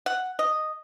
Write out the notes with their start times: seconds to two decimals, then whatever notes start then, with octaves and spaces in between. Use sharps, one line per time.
0.06 F#5
0.39 D#5